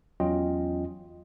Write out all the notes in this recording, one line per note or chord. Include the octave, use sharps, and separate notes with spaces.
E2 F#3 C#4 F4 D#5 G5